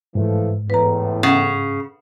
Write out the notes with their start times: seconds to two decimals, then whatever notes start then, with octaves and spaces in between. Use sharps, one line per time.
0.15 G#2 E3 F3 A3
0.70 E2 A2 B4 A#5
1.23 C#3 F#5